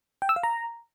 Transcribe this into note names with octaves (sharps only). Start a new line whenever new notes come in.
G5
E6
F5
A#5